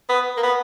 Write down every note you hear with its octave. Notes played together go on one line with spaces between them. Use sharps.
B3
A#3
B3